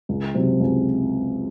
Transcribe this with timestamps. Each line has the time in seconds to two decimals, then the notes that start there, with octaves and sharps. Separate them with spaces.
0.09 C#2
0.35 C3 F#3 C4
0.60 C#2